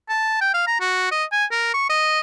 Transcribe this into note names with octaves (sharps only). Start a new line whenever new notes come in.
A5
G5
F5
A#5
F#4
D#5
G#5
A#4
C#6
D#5